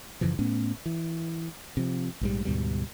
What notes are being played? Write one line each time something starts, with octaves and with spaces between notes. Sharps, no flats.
F#2 C#3 E3 F3
A2 A3 B3 C#4
E3
C3 F3
A#1 G#2 G3
D2 G#2 B2 G3